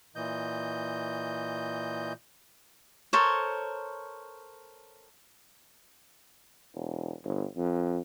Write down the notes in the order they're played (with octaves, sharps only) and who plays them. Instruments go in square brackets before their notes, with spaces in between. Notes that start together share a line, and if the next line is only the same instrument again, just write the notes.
[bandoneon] A#2 E3 D#5 G6
[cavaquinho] A4 A#4 C5 C#5
[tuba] E1
G1
F2